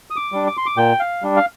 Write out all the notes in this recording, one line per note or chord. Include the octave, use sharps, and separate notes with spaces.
D#6
D6
G3 D4
D6
C6
D6
A#2 G5
F5
G3 D4
F5